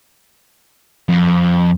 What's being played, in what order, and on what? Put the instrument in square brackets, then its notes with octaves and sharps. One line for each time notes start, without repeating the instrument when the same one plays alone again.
[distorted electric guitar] F2